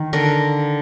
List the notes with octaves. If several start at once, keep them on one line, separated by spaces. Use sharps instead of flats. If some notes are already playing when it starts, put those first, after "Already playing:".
Already playing: D#3
D3 A#4